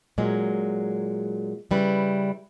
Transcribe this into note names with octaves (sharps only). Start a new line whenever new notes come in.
A#2 F#3 G#3
C#3 G3 E4 B4